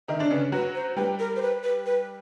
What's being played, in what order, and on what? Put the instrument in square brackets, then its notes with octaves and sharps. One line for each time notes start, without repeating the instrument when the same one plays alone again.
[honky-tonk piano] D#3 D#4 [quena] E5
[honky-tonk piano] D3 D4
[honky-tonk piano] C#3 C#4 [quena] B4
[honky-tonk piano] F#3 F#4 [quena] B4
[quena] C5
[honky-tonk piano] G3 G4 [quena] B4
[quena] A#4
C5
B4
B4
B4